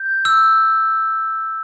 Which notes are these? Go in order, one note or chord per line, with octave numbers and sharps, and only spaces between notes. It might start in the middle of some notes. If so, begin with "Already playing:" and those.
Already playing: G6
E6